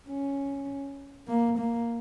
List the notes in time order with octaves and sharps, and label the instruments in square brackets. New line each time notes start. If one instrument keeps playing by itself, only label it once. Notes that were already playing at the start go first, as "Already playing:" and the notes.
[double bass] C#4
A#3
A#3